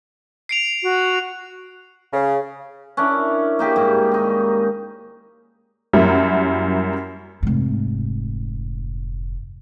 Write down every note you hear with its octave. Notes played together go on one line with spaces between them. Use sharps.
C7 D7 F7
F#4
C#3
C#4 D4 E4 A#4
A#3 D#4 G4 G#4
G#2 G3
D#3 D#4
F#2 F#3 G3 A#3 E4
F1 G#2